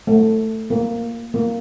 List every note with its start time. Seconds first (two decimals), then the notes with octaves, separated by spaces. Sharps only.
0.07 A3
0.70 A#3
1.34 A#3